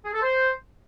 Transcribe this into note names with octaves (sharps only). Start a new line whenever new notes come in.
G#4
A4
C5